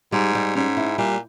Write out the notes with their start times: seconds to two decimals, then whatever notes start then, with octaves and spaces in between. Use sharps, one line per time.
0.12 G#2 G3
0.35 G3
0.55 G#2 C#4
0.77 E4
0.98 A#2 G3